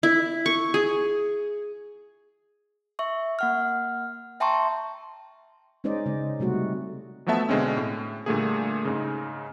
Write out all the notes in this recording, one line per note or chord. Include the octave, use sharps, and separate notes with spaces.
E4
C#6
G#4
E5 C#6
A#3 F#5 F6
E5 G5 A5 A#5 C6 C#6
G#3 C#4 D#4 C5 D5 D#5
C#3 G#3
C3 G3 A3 F#4
F3 F#3 A3 B3 E5 A5
B2 D3 G#3 C4 C#4
A2
A#2 D3 G3 A3 A#3 G#4
G#2 C#3